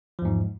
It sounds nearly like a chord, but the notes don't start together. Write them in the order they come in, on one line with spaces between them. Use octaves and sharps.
F3 E2 G#2